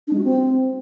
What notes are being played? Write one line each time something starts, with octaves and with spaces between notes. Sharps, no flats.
D4
G#3
F#4
C4